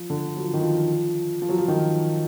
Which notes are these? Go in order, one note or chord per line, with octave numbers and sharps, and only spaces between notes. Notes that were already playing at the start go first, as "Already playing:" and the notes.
Already playing: F3
D3
F#3
F3
D#3
F3
F3
F#3
F3
D#3